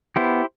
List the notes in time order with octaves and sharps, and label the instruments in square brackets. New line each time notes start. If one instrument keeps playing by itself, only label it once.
[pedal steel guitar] B3 E4 G4 C5